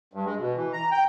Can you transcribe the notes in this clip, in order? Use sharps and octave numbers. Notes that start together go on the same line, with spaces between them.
G2
G#3
B2
E3
A#5
G5